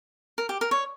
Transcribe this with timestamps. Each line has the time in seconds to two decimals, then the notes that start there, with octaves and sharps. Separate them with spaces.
0.38 A#4
0.49 G4
0.61 A#4
0.71 C#5